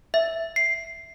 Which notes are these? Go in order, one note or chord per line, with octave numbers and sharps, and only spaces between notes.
E5
C7